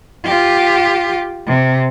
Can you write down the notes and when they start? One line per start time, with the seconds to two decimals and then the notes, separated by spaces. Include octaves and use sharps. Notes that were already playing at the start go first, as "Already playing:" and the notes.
0.25 F4 G4
1.47 C3